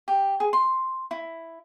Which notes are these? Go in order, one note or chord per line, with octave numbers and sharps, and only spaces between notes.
G4
G#4
C6
E4